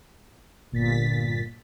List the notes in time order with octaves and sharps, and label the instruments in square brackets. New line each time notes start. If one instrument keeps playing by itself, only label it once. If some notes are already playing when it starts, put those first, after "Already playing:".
[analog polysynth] G1 A#2 A6 B6